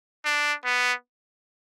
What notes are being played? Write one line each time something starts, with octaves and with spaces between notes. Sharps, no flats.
D4
B3